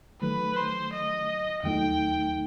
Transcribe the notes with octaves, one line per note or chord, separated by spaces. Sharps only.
D#3 F#3 A3 B4
C5
D#5
D#2 D#3 F#3 A3 D#4 G5